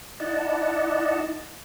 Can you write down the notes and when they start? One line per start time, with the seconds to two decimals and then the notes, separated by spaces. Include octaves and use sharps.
0.20 D#4 E4 D5 D#5 F#5 A5